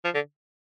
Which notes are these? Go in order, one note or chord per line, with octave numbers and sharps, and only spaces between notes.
F3
D3